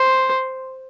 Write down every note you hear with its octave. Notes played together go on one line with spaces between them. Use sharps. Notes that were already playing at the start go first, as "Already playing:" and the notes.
Already playing: C5